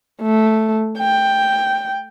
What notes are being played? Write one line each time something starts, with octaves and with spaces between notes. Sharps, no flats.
A3
G5